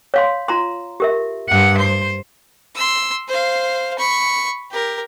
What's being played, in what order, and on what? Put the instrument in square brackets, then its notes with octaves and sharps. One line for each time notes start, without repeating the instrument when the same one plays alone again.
[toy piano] C#5 F5 C6
F4 A#5 C6
G4 A#4 E5
[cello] G2 F#5
C5
[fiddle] C6 E6
C5 F5
B5 C#6
G4 A#4